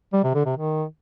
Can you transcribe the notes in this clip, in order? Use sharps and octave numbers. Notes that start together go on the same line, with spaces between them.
G3
C3
D3
C3
D#3